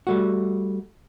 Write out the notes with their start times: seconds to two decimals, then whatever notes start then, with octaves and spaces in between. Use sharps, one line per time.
0.07 G3 A3 F#4